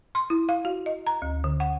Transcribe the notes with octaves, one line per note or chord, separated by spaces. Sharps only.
C6
E4
F5
F#4
D#5
A#5
D2
D3
F#5